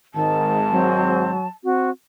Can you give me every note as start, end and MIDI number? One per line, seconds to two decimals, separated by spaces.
0.15 1.36 32
0.15 1.36 44
0.15 0.58 51
0.15 1.49 81
0.71 1.47 54
0.71 1.31 60
1.64 1.90 60
1.64 1.90 66